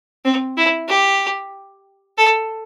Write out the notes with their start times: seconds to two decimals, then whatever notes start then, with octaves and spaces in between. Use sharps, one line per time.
0.25 C4
0.57 E4
0.88 G4
2.18 A4